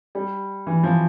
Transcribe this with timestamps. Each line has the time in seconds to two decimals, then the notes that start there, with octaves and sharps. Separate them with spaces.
0.15 G3
0.67 E3
0.83 F3